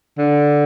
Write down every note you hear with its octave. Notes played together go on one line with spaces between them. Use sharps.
D3